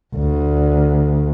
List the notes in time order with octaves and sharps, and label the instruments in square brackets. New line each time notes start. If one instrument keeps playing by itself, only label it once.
[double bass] D2